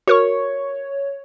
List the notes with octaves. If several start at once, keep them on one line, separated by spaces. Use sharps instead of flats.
F#4 A#4 C#5 C#6